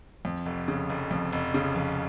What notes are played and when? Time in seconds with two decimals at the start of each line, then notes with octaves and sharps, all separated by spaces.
0.25 F2
0.46 F1
0.68 C#3
0.90 F1
1.11 F2
1.32 F1
1.54 C#3
1.75 F1